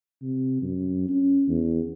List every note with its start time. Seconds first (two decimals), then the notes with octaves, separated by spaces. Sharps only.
0.21 C3
0.62 F#2
1.09 C#4
1.48 E2